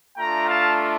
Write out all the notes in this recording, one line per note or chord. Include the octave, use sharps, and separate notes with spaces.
A3 D4 F4 G5 A#5
F5 A5